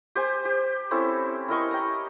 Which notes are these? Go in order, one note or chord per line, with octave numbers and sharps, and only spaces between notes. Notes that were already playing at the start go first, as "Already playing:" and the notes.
G4 C5 G#5
G4
C4 C#4 E4 A4
E4 A#4 D#5 C#6
G5 A#5